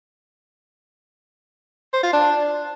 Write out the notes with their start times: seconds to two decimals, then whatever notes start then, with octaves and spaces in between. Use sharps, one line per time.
1.93 C5
2.03 F4
2.13 D4